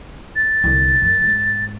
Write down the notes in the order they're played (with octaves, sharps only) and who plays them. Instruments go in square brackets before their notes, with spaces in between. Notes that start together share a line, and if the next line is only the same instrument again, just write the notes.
[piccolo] A6
[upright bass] C2 D3
F#2
G#2